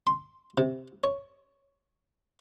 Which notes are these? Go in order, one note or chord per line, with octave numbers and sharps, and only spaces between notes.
C6
C3
C#5